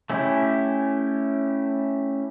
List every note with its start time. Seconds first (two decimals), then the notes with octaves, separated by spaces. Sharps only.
0.10 A3 C#4 E4 G4